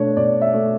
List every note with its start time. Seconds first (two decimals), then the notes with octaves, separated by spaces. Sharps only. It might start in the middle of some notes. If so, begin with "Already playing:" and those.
Already playing: B2 A3 D4 C#5
0.17 B2 D5
0.42 E5
0.54 A3